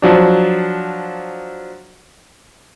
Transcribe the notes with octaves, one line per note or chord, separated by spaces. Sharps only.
F3 F#3 D4